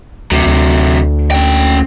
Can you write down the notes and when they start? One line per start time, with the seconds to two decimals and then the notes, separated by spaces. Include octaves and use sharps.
0.32 D2 C3 F#3
0.47 D2
1.31 C#4 G5